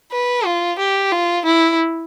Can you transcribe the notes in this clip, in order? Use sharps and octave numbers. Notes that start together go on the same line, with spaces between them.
B4
F4
G4
F4
E4